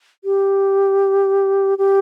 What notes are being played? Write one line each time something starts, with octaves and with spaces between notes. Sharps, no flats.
G4
G4